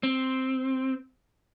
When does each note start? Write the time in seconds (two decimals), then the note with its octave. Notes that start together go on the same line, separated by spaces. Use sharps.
0.03 C4